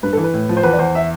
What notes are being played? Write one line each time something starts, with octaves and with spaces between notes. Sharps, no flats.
G2 B4
E3 A4
B4
A2
F3
C5
E2 B4
D5
E2 C5
E5